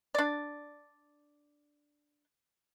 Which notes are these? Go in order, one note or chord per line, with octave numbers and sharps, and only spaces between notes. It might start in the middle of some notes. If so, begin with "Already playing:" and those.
D4 D5